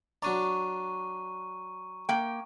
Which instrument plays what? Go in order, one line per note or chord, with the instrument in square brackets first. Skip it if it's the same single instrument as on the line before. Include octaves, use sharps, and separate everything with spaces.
[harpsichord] F#3 D4 D5 [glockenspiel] A#5 C#6 D#7
[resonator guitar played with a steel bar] A#3 G5